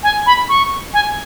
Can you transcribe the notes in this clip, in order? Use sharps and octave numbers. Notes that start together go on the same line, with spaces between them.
G#5
B5
C#6
G#5